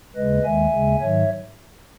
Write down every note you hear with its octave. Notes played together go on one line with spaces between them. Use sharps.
D#2 C#3 G#3 B4 D#5
D#2 D#3 G#3 E5 G#5
D#2 C#3 G#3
G#2 D#3 F#3 C#5 E5